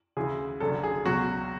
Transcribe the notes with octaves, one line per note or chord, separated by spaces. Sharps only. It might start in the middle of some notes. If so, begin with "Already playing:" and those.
D2 C#3 E3 G#4
F#1 F#2 D3 F#3 A4
G#4
C#2 B2 F#3 F#4